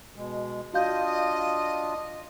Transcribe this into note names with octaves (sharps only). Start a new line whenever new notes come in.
B2 G#3
D4 F4 F#4 D#5 F5 G6